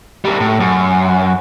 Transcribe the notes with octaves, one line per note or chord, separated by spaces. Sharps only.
G3 A#4
A2
F#2